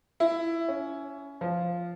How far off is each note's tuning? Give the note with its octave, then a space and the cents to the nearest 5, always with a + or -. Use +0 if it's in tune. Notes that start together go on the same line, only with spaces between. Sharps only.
E4 +15
C#4 +20
F3 +0